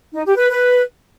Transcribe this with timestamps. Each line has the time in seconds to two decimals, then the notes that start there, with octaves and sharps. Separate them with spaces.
0.14 D#4
0.25 G4
0.37 B4
0.48 B4